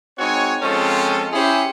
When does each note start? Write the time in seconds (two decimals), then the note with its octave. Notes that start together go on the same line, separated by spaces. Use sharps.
0.19 G#3 C4 D#4 F#4 C#5 G#5
0.62 F3 G#3 C4 C#4 F4 A4
1.33 C#4 E4 G4 G#4 C5